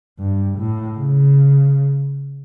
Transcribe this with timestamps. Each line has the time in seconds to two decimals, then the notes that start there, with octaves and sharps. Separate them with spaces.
0.19 G2
0.59 A2
0.99 C#3